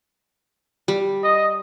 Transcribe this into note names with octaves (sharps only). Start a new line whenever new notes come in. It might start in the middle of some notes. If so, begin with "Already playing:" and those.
G3
D#5